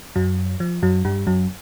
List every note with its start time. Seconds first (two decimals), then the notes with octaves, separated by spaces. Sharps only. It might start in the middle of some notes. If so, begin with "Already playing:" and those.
0.16 F#2 F#3
0.60 F3
0.82 F#2 F#3
1.05 G2 G3
1.27 F#2 F#3